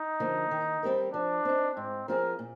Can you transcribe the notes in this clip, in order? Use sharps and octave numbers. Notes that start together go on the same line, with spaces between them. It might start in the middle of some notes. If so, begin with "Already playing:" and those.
Already playing: D#4
D3 F3 A#3
D#3
G3 C4 G4 A#4
F3 D4
C4 D#4
G#2 C4
F3 C4 F4 G#4 A#4
A#2